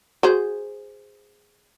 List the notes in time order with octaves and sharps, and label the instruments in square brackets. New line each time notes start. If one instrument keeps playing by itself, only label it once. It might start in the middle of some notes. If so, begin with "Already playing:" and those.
[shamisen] F#4 G#4 C5